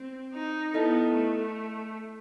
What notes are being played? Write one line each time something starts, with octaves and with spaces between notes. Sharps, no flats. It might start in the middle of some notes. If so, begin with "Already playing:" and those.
Already playing: C4
D#4
B3 E4 A4 D#5 A5
A3